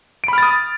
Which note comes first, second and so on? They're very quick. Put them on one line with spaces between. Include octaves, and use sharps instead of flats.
D7 B5 F6 A6 D#6